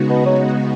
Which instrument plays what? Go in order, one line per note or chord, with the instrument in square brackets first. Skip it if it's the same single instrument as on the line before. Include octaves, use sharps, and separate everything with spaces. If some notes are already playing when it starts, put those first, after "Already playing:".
Already playing: [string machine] C#3 G#3 B3 D#4 F#4
[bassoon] B2
F#3